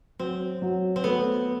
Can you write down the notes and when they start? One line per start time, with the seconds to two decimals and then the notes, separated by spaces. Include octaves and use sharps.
0.19 F#3 C4
0.62 F#3
0.96 C4
1.04 A3 B3